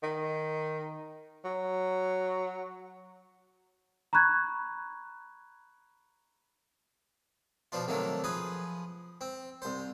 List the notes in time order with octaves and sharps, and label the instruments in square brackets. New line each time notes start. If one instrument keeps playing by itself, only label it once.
[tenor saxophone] D#3
F#3
[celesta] A#5 B5 C#6 F#6 G#6
[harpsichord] B2 F3 D4 F4
C3 D#3 F#3 A3 A#3
F3 G#4 B4
C4
C2 C5